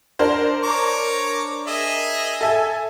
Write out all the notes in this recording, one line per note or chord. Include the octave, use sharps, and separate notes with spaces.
D4 A#4 C5
C#5 A#5 D6
G#4 D#5 E5
A4 E5 G#5